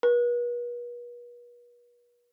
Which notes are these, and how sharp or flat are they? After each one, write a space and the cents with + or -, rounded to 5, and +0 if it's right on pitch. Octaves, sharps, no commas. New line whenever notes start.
B4 -40